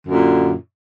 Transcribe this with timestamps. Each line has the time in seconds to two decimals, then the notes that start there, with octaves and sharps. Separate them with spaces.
0.05 D3
0.08 F#2
0.11 A#2